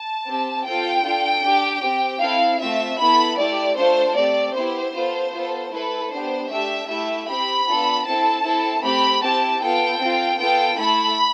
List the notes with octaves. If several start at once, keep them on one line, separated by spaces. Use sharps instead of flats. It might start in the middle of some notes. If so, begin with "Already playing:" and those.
Already playing: A5
C4 G4
C4 F4 A4 G5
D4 F4 A4
D4 G4
C4 G4
C4 E4 A4 F5
A3 C4 F4 E5
B3 E4 A4 B5
A3 E4 G4 D5
A3 D4 F4 A4 C5
A3 C4 G4 D5
B3 E4 G4 C5
B3 F4 A4
B3 F4 A4
A3 E4 A4 B4
B3 D4 G4 C5
A3 D4 G4 E5
A3 E4 G4 E5
C4 G4 B5
B3 D4 F4 A4
C4 E4 A4 A5
C4 E4 A4
A3 C4 G4 B5
C4 E4 G4 A5
B3 F4 A4 G5
C4 F4 A4
B3 F4 A4 G5
A3 E4 A4 B5